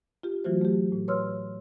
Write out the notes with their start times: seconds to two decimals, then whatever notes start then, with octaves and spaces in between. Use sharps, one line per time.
0.23 F4 G4
0.44 E3 F#3 A3 F4 F#4 C5
0.61 A3 G4
0.92 A2
1.08 B4 C#5 C6 E6 F6